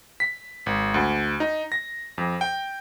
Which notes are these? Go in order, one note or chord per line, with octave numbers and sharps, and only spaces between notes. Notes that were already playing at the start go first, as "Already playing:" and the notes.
B6
G#1
D2
D#4
A#6
F2
G5